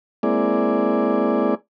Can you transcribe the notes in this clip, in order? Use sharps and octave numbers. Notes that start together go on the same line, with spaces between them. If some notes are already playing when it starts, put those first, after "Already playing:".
G#3 A#3 C4 E4 G#4 D5